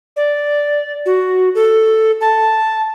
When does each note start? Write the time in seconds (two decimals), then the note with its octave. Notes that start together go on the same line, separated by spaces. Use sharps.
0.16 D5
1.06 F#4
1.55 A4
2.21 A5